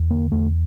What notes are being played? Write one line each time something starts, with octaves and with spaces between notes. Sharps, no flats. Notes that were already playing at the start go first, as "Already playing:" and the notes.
Already playing: E2
D3 A#3
E2 A3